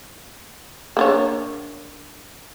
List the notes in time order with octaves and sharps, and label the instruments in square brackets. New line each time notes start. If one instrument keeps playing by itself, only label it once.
[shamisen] A#3 D4 C#5